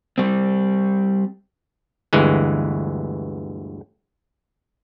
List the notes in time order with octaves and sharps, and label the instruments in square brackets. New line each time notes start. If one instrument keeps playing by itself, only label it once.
[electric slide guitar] G3 C4
[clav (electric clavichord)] G1 D2 E3 G#3